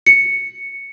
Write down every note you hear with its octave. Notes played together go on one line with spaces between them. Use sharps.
C#7